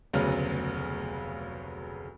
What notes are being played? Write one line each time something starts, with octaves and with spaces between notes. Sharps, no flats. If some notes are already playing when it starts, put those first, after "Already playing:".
F1 D2 C#3 F#3 B3 F6